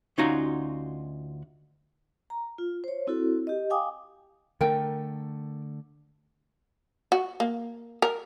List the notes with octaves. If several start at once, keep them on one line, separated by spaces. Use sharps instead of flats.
D2 C#4 D#4 F4 F#4 A#5
A#5
F4
C5 C#5
C4 E4 F#4 A4
G4 D#5
F5 G5 G#5 D6 D#6
D3 A3 A#4 G5
F#4
A#3
A#4